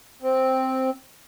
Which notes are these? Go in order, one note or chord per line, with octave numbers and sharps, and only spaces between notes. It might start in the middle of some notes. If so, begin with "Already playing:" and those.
C4